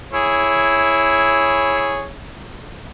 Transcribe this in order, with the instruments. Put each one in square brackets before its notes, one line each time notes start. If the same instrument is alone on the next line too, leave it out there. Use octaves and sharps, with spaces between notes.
[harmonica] E4 G#4 C#5